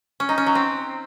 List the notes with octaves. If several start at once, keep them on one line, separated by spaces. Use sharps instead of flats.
C#4
D#4
C#4
F#3
C4